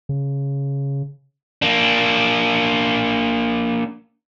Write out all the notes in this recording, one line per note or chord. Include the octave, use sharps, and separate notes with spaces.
C#3
A#3 D4